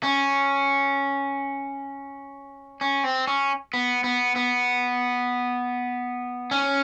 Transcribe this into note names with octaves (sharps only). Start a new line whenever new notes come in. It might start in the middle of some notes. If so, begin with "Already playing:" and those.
C#4
C#4
C4
C#4
B3
B3
B3
C#4